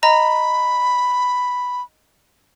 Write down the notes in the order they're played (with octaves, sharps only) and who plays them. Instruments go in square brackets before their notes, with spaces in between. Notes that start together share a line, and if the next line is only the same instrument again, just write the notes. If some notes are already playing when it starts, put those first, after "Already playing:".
[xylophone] D#5 A#5 [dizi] B5